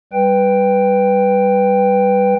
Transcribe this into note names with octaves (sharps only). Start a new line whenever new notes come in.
G3 B4 G5